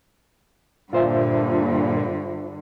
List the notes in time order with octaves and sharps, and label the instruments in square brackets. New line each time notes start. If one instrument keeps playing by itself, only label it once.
[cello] G2 D3 [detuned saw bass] A#2 [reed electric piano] F4 C5 E5